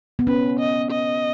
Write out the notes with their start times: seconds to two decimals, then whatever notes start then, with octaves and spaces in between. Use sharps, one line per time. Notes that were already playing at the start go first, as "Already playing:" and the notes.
0.19 B3
0.27 C#4 B4
0.59 D#5
0.91 D#5